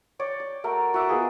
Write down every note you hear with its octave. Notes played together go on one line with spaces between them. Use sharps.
C#5 D5 G5
D5
A3 F#4 A#4 G5
F#4 E5 D6
B3 F4 G#4